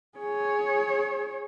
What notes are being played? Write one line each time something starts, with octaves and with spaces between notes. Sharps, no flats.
G#4 C#5